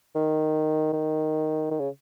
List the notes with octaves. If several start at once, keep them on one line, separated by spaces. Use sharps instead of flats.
D#3
D#3
D#3
C#3